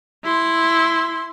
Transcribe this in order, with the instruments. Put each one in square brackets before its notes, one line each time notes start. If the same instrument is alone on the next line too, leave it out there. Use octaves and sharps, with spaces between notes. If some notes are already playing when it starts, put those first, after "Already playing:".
[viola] E4 C6